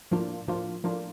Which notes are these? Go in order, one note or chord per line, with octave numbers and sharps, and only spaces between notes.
A2 F3 A#3 D4 F4
A2 F3 A#3 D4 F4
A2 F3 A#3 D4 F4